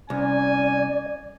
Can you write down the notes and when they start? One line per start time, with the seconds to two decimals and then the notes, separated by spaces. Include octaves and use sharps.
0.10 C2 C#4 D5 G#5